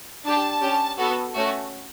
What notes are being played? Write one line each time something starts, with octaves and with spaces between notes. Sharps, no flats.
D4 G4 A5
C#4 G4
B3 F#4 A4
A3 C#4 F#4